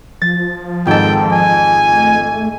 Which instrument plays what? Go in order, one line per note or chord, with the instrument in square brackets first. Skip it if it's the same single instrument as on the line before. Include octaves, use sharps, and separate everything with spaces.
[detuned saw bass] F3 [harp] A6
[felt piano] F2 D#3 G#3 [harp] G#2 A4 [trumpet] G5
[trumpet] G#5
[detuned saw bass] A3